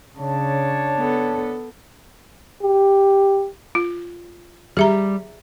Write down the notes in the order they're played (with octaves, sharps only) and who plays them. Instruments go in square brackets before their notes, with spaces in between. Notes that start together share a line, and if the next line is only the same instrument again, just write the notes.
[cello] C#3 [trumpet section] D4 C#5 A5
[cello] B3 A4
[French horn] G4
[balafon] F4
[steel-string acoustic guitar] G3 [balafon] G#4 E5 A#5